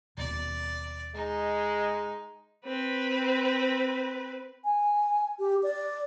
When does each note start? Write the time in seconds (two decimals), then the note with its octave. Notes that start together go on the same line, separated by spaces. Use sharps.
0.18 D#1 B2 D5
1.15 G#3 D#4
2.66 C4 B4
4.65 G#5
5.39 G4
5.63 D5